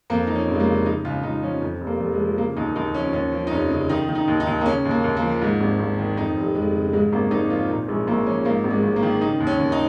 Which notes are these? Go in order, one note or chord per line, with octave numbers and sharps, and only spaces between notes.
F2 A#3
F3 D#4
C#4
F1
G#3
A#3
C#3
C#3 D#4
C#2 F4
C#2 D#4
F3 C#4
F2
F1
A#3
F1
G#3
F3
C#3 A#3
D#2 D#4
D#2 D#4
F3 C#4
D#2 C#4
F3
D#4
F1 C#4
C#3
D#3 D#4
D#3
D#4
D#2
D#4
D#2
A#3
C#3 C#4
D#2
A#3
D#2
A#3
F3
G#2
G#1
G#1
D#3
F2 D#4
F1
F1 G#3
C#3
G#2 G#3
G#1 A#3
G#1 D#4
F3 F4
A#2 D#4
A#1 G#3
A#1 A#3
F3 C#4
G#2 A#3
G#1
G#3
G#1
A#3
D#3
C#3 D#4
D#2
C#4
D#2
D#4